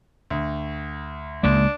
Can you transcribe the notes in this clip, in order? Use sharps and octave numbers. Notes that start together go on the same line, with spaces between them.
D2
C#2 G#3 A#3 D4